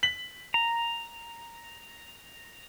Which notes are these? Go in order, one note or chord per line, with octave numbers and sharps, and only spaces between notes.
B6 F#7
A#5